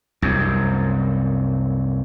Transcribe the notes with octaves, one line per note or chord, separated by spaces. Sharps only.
C2 F#2